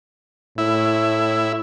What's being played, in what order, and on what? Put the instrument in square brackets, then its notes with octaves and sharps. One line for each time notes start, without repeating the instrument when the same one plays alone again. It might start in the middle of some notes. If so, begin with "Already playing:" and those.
[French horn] A2 [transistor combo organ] E4